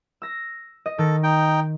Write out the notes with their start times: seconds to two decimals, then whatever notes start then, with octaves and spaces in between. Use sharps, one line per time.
0.22 E6 A#6
0.86 D#5
0.98 D#3 A4
1.23 D#4 G5